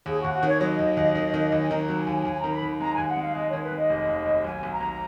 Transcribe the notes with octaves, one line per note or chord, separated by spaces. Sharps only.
D#2 G#4
F#4
D#2
F#4
D#3 C#5
F#3 D#5
D#2
D#2
D#3
D#3
D#2
G#5
D#3 A#5
F#3
G#5
D#2
D#2 G#5
A#5
D#3
B5
D#3
G#3 A#5
D#2 G#5
F#5
G#3 F5
G#3 D#5
D#3 C#5
B4
G#3 D#5
F1
D#2
D#2
B1 G#5
B1
A#5
B1